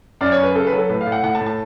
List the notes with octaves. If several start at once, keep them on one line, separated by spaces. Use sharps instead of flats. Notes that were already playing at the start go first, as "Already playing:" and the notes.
F#2 D5
C#5
F#2
B4
C#3 A4
B4
F#3
A4
A2 B4
F5
A2
F#5
A2 F#5
A5
A2
A5